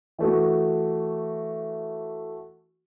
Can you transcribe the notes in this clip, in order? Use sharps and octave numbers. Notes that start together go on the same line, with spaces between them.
E3 A3 F#4